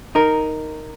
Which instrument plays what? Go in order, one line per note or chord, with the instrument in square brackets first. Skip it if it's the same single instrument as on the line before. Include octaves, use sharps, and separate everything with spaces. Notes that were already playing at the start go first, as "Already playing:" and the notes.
[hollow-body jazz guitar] D#4 A#4